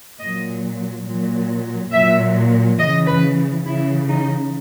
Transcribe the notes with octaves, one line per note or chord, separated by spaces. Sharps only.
A#2 F#3 D#5
A#2 F#3
A#2 F#3 E5
C#3 E3 D#5
B4
C#3 E3 E4
D#4